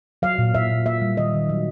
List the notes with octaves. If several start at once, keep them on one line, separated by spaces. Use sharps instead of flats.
F#3 F5
A#2
A#2 E5
A#2
A#3 E5
G3
D#3 D#5
D#3
F#3